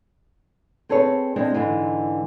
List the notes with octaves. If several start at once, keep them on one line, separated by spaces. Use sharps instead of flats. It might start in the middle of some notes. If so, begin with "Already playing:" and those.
C4 G#4 A4 B4 C#5
G#3 C4 D4 E4 G5
G#2 D3 E3